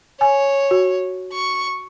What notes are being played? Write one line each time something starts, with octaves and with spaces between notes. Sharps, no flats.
C#5 G#5
F#4
C#6